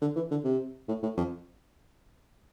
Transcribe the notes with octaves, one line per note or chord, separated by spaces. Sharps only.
D3
E3
D3
C3
A2
A2
F2